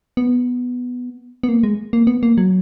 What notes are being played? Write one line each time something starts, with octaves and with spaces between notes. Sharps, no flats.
B3
B3
A#3
G#3
A#3
B3
A#3
F#3